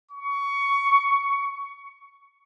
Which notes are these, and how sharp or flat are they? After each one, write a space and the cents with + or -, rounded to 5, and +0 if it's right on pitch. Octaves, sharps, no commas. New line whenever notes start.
C#6 +20